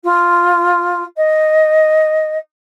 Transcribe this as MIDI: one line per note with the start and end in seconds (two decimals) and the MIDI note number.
0.04 1.03 65
1.17 2.37 75